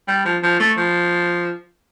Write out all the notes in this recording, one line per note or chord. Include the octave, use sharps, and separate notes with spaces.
G3
F3
F3
A3
F3